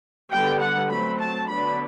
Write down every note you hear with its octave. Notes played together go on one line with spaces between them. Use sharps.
D3 G3 B3 G5
F#5
F#3 A3 C4 B5
A5
D3 F#3 B3 D4 B5